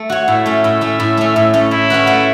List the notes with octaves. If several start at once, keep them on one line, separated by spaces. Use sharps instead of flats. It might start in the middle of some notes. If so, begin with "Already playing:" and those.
Already playing: A3
F#4 C#5
A2 E5
A3 C#4
A2 E5
A3 C#4
A2
A3 C#4
A2
A3 C#4
A3 E4
C#4 F#4 B4
A3